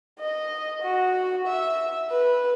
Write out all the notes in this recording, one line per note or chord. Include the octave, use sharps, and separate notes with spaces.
D#5
F#4
E5
B4